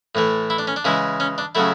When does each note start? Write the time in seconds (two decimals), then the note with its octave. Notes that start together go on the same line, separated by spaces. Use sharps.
0.15 A2 E3 A3
0.50 E4
0.59 D4
0.67 C#4
0.76 D4
0.85 C#3 E3 G#3 E4
1.20 C#4
1.38 D4
1.55 C#3 F#3 A3 E4